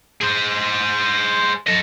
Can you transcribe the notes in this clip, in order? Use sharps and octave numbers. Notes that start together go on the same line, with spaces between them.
G#4 C5
A4 D#5